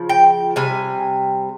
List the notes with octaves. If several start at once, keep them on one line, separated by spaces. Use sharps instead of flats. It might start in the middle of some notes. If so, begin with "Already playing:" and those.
Already playing: C#3 F3
G5
C3 G3 G#5